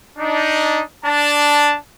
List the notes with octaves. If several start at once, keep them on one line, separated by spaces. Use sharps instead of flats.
D4 D#4
D4 A5